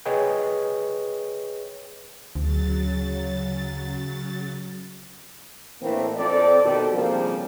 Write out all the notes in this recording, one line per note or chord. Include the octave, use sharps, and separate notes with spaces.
G#4 B4 C#5 D#5 G5
D2 C#3 F#3 A6
A2 E3 A#3 C4 D4
F2 C4 A4 D5
G2 B2 D#3 G4 A4
C#3 F3 G3 A#3 C4 D4